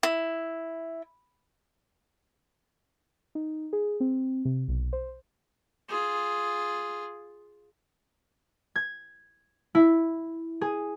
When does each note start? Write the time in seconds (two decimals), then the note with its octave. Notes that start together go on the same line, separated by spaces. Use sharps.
0.03 E4
3.35 D#4
3.73 G#4
4.00 C4
4.45 C3
4.68 B1
4.93 C5
5.89 F4 G#4
8.76 G#6
9.75 E4
10.61 G#4